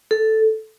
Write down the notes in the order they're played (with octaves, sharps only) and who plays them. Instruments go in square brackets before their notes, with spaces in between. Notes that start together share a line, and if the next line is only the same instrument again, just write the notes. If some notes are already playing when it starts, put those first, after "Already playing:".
[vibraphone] A4